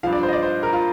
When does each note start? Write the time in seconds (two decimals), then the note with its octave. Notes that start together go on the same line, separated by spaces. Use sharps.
0.03 G2 F3 F5
0.13 D5
0.23 C5
0.28 D#5
0.33 D5
0.43 C5
0.63 A#4
0.73 F4